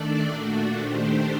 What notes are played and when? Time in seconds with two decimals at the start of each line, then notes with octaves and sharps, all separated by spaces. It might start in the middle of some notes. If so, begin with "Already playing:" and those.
Already playing: D#3 A3 D4 A4 D5
0.26 A#2 A3 D4 F#4
0.75 D#3 A3 D4 G4 C5